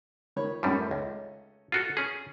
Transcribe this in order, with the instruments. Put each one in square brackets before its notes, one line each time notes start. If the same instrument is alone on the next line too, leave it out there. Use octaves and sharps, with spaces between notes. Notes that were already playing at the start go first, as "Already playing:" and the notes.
[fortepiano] D#3 C#5 B5
[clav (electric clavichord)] F#2 A2 G3 [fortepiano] A3 C#4 D#4
[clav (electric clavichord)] C#2
[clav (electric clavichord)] F4 F#4 A4 [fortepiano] F6
[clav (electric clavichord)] C#4 G#4